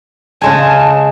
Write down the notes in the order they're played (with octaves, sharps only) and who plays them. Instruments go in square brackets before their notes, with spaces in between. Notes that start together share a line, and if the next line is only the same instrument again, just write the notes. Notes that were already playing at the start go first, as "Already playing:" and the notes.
[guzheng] C#3 G#3 G#5 [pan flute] A5